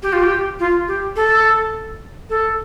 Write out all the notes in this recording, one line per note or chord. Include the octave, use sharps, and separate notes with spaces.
G4
F4
G4
F4
G4
A4
A4